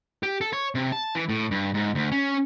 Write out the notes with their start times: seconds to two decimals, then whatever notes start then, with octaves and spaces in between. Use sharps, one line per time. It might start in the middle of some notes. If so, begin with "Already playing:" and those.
0.23 G4
0.41 A4
0.53 C#5
0.75 C3
0.92 A5
1.15 E3
1.29 A2
1.51 G2
1.74 G#2
1.95 D2
2.12 C#4